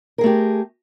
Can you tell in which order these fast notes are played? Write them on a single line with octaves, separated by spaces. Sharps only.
A#4 G#4 A3 G4